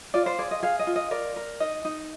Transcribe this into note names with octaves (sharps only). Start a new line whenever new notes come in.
F4 D5
C5
G#4 D5
D#5
G#4 F5
D#5
F4
D#5
A#4 D5
A#4
D#4 D#5
D#4